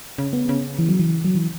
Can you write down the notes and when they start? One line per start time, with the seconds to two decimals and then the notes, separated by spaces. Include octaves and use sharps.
0.18 C#3
0.33 B3
0.49 C#3
0.79 E3
0.89 F#3
0.99 E3
1.24 F#3
1.35 E3